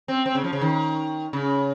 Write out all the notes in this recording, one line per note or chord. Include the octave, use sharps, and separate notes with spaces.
C4
C4
C#3
F3
C#3
D#3
C#3